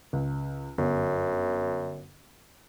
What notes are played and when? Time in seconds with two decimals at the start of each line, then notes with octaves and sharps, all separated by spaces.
0.13 C#2
0.78 G1 F#2